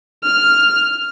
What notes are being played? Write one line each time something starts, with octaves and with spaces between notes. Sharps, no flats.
F6